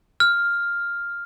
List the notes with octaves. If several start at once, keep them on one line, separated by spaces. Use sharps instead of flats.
F6